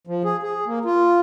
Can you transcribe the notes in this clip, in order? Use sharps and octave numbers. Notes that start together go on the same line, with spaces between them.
F3
G#4
G#4
A#3
F4